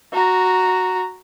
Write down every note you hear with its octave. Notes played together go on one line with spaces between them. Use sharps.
F#4 A#5